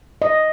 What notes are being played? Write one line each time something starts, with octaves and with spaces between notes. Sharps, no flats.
D#5